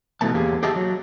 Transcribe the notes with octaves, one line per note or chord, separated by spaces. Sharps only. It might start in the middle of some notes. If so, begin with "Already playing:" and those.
B2 E3 G3 A3 A#3 A5
E2 A#3 G4 G#4
G4 G#4 D#5 E5 A5
F#3